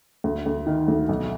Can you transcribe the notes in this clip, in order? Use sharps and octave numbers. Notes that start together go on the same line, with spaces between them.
D2
D2
D#3
D2
B1